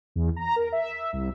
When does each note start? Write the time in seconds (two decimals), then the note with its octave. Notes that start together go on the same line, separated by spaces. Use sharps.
0.16 E2
0.36 A#5
0.56 A#4
0.72 E5
1.13 C2